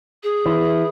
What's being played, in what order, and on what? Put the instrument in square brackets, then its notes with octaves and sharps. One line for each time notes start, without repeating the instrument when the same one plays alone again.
[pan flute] G#4
[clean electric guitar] E3